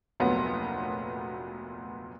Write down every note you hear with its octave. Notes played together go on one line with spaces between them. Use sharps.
F1 D2 A#2 F#3 B3